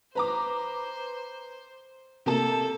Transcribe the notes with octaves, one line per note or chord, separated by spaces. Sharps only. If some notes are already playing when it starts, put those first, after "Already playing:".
B4 C5 A#5 D6
C3 A#3 A4 A5